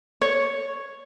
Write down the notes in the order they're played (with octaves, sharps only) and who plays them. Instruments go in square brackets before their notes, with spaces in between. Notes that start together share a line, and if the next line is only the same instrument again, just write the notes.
[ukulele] C#5